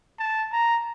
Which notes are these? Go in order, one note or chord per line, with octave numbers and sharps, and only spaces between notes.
A5
A#5